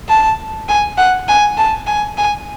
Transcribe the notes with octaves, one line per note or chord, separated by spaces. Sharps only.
A5
G#5
F#5
G#5
A5
G#5
G#5